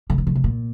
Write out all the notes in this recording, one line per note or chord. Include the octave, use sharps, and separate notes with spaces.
D3
D#3
D3
C3
A#2